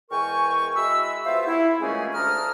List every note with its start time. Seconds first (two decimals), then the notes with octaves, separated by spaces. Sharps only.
0.11 E2 G#3 A#4 G5 G#5 C#6
0.76 G#3 E4 F#4 B5 E6
1.26 G3 B3 F4 C5 E5 F5
1.47 E4
1.82 A#2 E3 G#3 A3 C#4 G#4
2.15 D2 D4 A4 A#5 D#6 F6